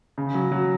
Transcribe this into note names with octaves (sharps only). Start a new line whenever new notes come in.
C#3
F#3
F#3